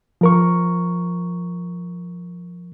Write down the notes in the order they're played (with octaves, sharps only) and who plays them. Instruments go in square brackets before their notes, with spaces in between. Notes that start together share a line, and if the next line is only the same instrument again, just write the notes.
[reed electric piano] F3 A#4 C#6